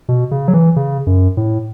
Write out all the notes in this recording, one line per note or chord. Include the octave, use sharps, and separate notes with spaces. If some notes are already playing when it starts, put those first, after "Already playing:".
B2
C#3
F#3
E3
C#3
F#2
A2